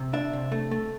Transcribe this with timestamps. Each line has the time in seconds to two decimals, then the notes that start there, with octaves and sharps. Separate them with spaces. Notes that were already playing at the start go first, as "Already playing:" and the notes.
Already playing: C3
0.13 D4 E5
0.33 C3
0.52 A3
0.71 A3